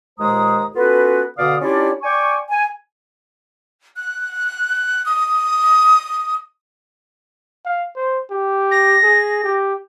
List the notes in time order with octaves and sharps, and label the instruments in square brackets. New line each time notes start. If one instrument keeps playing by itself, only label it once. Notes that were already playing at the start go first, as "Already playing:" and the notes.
[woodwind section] D#2 A#2 G#3 C5 A#5 D#6
B3 C#4 F4 F#4 A4 B4
B2 D3 D5 F5 D#6
C#4 D4 E4 F4 G4 D5
D5 G5 G#5 C#6
G#5
[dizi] F#6
D#6
[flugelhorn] F5
C5
G4
[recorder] A#6
[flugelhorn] G#4
G4